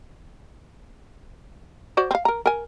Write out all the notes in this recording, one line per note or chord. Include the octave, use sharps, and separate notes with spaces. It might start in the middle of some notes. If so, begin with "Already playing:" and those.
F#4 C5 D5
C4 F5
A#4 A#5
A#4 G#5